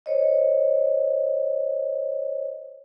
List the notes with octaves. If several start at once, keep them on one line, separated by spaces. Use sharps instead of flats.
C5 C#5 D#5